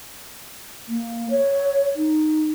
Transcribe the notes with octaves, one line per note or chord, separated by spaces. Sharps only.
A#3
C#5
D#4